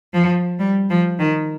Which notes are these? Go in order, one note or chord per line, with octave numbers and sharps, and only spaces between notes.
F3
G3
F3
D#3